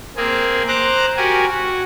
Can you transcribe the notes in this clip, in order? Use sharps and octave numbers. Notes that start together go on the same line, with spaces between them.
A#3 C4 G#4
C5 A#5 D6 F#6
F#4 G4 A#4 G#5
F#4